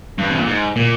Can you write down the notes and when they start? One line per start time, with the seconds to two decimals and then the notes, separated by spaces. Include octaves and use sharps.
0.19 G2
0.30 C3
0.39 A#2
0.47 G#2
0.76 A#2